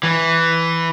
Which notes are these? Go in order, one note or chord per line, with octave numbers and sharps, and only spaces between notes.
E3